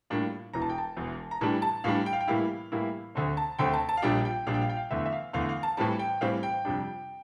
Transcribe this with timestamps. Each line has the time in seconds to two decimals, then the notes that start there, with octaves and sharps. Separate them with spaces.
0.10 A2 G3 A#3 D4 F4
0.53 E1 E2 E3 A#5
0.62 A5
0.70 G5
0.78 A5
0.96 E1 E2 E3
1.31 A#5
1.41 A2 E3 G3 D4 A5
1.62 A5
1.84 A2 E3 G3 D4 F5
2.06 G5
2.13 F5
2.21 G5
2.28 A2 E3 G3 A#3 E4 F5
2.72 A2 E3 G3 A#3 E4
3.15 D2 D3 A3 C4
3.37 A5
3.59 D2 D3 A3 C4 G5
3.74 A5
3.89 A5
3.97 F5
4.02 A#1 A#2 G3 D4 F4 G5
4.25 G5
4.47 A#1 A#2 G3 D4 F4 F5
4.54 G5
4.61 F5
4.70 G5
4.77 F5
4.91 E2 D3 A3 E5
5.06 E5
5.12 F5
5.33 E2 D3 A3 F5
5.49 F5
5.63 A5
5.77 A2 E3 G3 C4 A5
5.99 G5
6.21 A2 E3 G3 C4 F5
6.43 G5
6.65 F2 C3 G3 D4